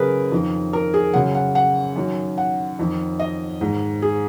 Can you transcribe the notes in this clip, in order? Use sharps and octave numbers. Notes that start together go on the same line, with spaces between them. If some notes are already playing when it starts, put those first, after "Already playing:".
Already playing: F#2 C#3 G#4 A#4 B4
F2 D#3
A#4
G#4
F#2 C#3 F#5
F#5
F#5
F#2 D#3
F#5
F2 D#3
D#5
G#2 D#3
G#4